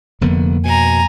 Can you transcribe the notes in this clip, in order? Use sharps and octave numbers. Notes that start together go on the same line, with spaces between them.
F1 F2 D3 A#3 B3
B2 G#5 A#5